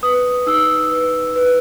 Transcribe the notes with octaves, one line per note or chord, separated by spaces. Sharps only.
B4 D#6
D#4 E6
B4
B4